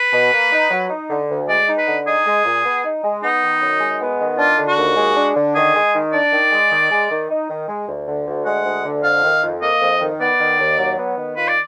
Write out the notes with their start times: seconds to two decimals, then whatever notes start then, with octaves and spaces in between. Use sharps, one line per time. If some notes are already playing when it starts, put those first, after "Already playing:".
Already playing: B4
0.13 B2
0.33 A#3
0.52 D#4
0.70 F#3
0.90 D#4
1.10 D3
1.29 D2
1.48 G#3 D5
1.68 D#4
1.78 B4
1.87 D3
2.06 D#4 G#4
2.26 G#3
2.45 A#2
2.65 B3
2.85 D#4
3.04 G#3
3.23 B3 D#4
3.43 D#3
3.61 F#2
3.80 G#3
4.01 B3
4.19 D#3
4.38 D4 F4
4.58 D3
4.68 F#4
4.77 D#2
4.96 G#3
5.16 D4
5.36 D3
5.55 D#3 G#4
5.75 G#3
5.95 D#3
6.13 D4 D5
6.32 D#3
6.52 G#3
6.71 D#3
6.91 G#3
7.10 D#3
7.30 D#4
7.50 D#3
7.68 G#3
7.88 D2
8.08 D3
8.27 D2
8.46 G#3 F#5
8.65 D2
8.85 D3
9.03 F2 F5
9.24 D#3
9.42 F2
9.61 A#3 D#5
9.81 F2
10.01 D#3
10.20 B3 D5
10.40 D#3
10.60 D#2
10.78 F#3
10.98 B3
11.17 D#3
11.36 F4 B4
11.48 D5